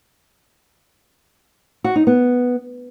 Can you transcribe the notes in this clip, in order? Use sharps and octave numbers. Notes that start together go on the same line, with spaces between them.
F#4
D#4
B3